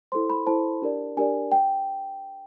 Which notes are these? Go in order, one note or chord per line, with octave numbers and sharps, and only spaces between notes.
E4 A4 C5 C6
B5
E4 A4 C5 A5
D4 G4 A#4 D5
D4 G4 A#4 D5 G#5
G5